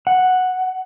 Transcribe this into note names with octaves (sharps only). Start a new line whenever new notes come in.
F#5